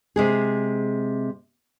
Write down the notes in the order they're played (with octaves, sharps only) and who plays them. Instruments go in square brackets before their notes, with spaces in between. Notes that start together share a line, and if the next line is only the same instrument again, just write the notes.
[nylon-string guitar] C3 G#3 G#4